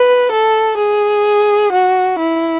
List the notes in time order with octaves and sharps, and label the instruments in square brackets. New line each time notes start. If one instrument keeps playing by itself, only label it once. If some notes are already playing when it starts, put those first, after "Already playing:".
Already playing: [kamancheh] B4
A4
G#4
F#4
E4